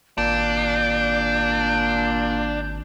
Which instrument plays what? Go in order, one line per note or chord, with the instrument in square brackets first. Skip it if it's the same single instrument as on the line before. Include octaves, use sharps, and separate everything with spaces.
[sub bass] G#1 [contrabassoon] A#2 [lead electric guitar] D4 [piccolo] G6